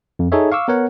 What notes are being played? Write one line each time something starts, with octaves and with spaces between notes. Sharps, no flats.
F2
D#4 G#4 A4 C#5 E5
F5 C#6 D6 E6
B3 A#4 C#5 F#5